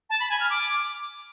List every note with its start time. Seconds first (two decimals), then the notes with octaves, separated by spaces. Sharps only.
0.09 A5
0.20 B5
0.30 G#5
0.40 F6
0.50 D6